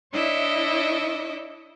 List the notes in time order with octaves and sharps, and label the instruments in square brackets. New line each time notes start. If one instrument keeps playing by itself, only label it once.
[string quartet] D4 E4 C#5 D#5 E5 D6